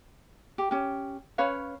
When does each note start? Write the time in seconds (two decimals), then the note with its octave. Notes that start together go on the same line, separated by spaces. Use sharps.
0.58 G4
0.71 C#4 G4
1.38 C#4 B4 C#5 F5